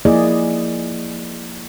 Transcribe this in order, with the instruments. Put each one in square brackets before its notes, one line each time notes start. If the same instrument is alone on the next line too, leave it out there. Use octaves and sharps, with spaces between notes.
[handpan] F3 A#3 E4 G#4 D5 D#5